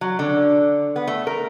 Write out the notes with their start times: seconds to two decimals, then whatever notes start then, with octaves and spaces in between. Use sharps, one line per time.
0.01 F#3
0.19 D3
0.96 B3
1.07 A3
1.27 A#4